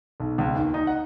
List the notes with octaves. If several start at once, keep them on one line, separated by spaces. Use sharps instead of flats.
B1
C#2
D#2
D#4
F#5